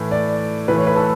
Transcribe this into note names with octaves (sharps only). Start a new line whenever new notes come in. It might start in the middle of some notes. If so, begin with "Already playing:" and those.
Already playing: A2 E3
D5
A2 E3 B4
C#5
B4
A4